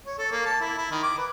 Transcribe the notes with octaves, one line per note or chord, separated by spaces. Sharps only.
C#5
A4
A#3
A5
E4
E4
D#3
D6
B4